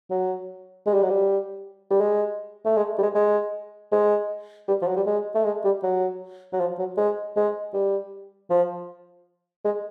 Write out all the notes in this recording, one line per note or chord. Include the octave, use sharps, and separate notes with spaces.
F#3
G#3
G3
F#3
G3
G3
G#3
A3
G#3
G3
G#3
G#3
G#3
G3
F3
F#3
G3
G#3
A3
G#3
G3
F#3
F#3
F3
F#3
G#3
G#3
G3
F3
G#3